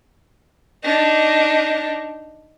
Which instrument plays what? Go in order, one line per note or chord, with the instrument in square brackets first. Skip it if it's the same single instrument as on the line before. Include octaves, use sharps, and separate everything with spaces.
[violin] D4 D#4